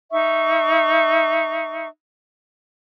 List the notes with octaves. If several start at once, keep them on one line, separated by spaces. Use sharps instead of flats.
D#4 E5 C#6